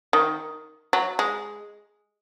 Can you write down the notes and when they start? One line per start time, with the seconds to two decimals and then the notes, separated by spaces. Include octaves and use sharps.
0.13 D#3
0.93 F#3
1.19 G#3